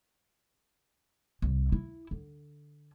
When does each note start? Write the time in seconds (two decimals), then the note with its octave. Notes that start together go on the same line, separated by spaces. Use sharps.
1.42 C2
1.72 E4
2.11 D3